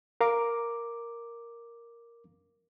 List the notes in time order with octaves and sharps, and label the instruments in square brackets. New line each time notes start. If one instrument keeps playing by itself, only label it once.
[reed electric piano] A#4 F5 A#5 D6